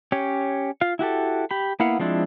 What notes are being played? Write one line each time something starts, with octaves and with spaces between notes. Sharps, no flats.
C#4 G4 C#5
F4 F5
E4 F#4 G4 A4
G4 B5
A#3 B3 E4 F5 F#5
F3 G#3 C4 D4 E4